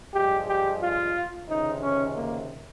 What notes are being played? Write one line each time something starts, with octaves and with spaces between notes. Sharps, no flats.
G2 F3 G#3 G4
G4
F4
C#2 C3 D#3 D#4
C#4
A#3